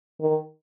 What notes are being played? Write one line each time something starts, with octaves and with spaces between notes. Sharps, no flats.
D#3